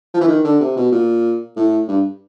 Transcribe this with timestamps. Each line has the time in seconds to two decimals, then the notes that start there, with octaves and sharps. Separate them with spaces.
0.14 F3
0.21 E3
0.28 D#3
0.44 D3
0.61 C3
0.77 B2
0.92 A#2
1.56 A2
1.88 G2